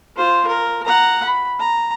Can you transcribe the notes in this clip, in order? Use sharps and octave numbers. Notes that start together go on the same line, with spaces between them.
F4 C5
A#4
F#5 A#5
B5
A#5